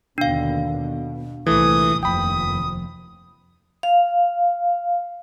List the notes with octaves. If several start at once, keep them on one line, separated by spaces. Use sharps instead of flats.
D#2 B2 D3 D4 F5
B2
C2 A#2 E3 A3 D#6
F1 D#2 F3 G5 B5 D#6
F5